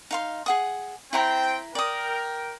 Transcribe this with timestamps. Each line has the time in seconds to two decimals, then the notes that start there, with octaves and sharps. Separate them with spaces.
0.11 D#4 F5 C6
0.46 G#4 F#5 D#6
1.13 C4 E4 C5 G5 A#5 C6
1.75 A#4 D5 G5 D#6